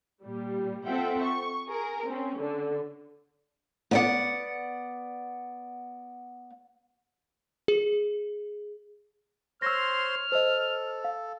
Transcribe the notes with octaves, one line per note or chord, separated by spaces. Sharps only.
A#2 G3
C4 F4 A4 E5 F#5 G5
C#6
G#4 A#4
C4 C#4
D3
B3 D5 F#5
G#4
C5 C#5 C6 E6 F6 A#6
A4 C5 D#5
F5